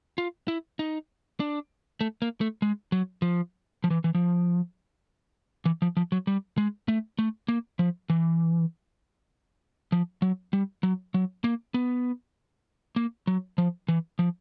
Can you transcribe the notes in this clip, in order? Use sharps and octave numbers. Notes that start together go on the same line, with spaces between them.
F4
E4
D#4
D4
A3
A#3
A3
G#3
F#3
F3
F3
E3
E3
F3
E3
F3
F3
F#3
G3
G#3
A3
A3
A#3
F3
E3
F3
F#3
G3
F#3
F#3
A#3
B3
A#3
F#3
F3
E3
F3